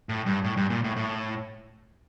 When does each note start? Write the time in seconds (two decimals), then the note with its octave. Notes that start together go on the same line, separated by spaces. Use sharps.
0.09 A2
0.26 G2
0.44 A2
0.57 G2
0.70 A#2
0.84 A2
0.96 A2